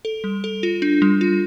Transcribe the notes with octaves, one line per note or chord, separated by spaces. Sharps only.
A4
G3
A4
F4
D4
G3
F4